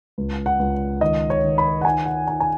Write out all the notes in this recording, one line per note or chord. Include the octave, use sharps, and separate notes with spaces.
C#2
F#5
C#2
D#3 D#5
C#5
D#3
B5
F#5
D#4 G#5
F#5
D#4 G#5
G#5